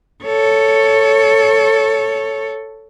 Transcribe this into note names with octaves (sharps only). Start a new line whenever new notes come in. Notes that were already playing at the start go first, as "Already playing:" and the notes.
A4 C#5